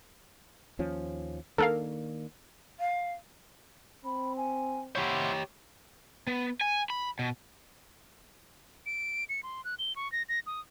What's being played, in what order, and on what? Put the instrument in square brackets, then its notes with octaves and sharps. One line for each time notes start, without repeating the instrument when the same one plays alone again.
[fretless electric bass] D#2 F3 C#4
[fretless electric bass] D#3 A#3 D4 [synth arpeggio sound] A4 A#4 F5
[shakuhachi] F5
[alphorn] C4 [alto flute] B5
[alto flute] G#5
[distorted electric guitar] E4 C5 [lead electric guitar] G4 C#5 [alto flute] F#5
[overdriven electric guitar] B3
G#5
B5
B2
[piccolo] D7
C#7
C6
F#6
G7
C#6
A#6
A#6
D#6